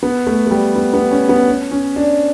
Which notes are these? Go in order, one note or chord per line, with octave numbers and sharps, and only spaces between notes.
B3
A3
A3
G3
B3
B3
C#4
B3
C#4
C#4
D4